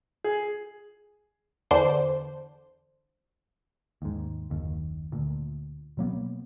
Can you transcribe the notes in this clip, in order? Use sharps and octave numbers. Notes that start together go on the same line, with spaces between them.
G#4
E2 D3 D4 C5
D#2 G#2
F#1 D#2
D2 A#2
B2 F#3 A#3 B3